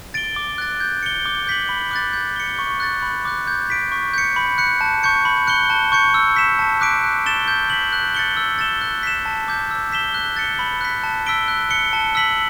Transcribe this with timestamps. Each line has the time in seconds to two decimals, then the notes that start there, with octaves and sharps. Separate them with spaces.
0.14 A6 D7 G7
0.36 D6
0.58 F#6 A6
0.80 G6
1.03 C#7 G7
1.25 D6
1.47 G6 B6 F#7
1.69 B5
1.91 D6 F#6 A6
2.13 G6
2.36 C#7 G7
2.59 C#6
2.80 F#6 A6
3.02 B5
3.25 D6 F#6
3.47 G6
3.70 B6 D7
3.92 C#6
4.14 G6 C#7
4.36 B5
4.58 F#6 C#7
4.81 A5
5.03 C#6 G6 C#7
5.25 B5
5.47 F#6 C#7 G7
5.70 A5
5.92 C#6 G6 C#7
6.14 E6
6.36 B6 E7
6.59 A5
6.81 D6 F#6 B6 D7
7.03 F#6
7.26 A6 E7 G7
7.48 G6
7.70 B6 F#7
7.93 F#6
8.15 A6 C#7 G7
8.37 E6
8.59 A6 E7 G7
8.81 F#6
9.03 B6 E7
9.25 A5
9.48 D6 G6
9.71 E6
9.92 B6 E7 G7
10.14 F#6
10.36 A6 C#7 G7
10.59 B5
10.81 F#6 B6
11.03 A5
11.26 E6 B6 D7 G7
11.48 F#6
11.70 C#7 G7
11.93 A5
12.15 E6 B6 F#7